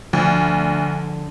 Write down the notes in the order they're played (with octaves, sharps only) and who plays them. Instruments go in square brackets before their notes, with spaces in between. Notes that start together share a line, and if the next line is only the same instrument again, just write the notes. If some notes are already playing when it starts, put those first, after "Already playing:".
[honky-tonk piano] D2 [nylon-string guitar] D3 [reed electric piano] F3